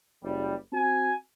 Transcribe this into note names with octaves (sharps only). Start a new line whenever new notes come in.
F#1 G3
C4 F#4 G#5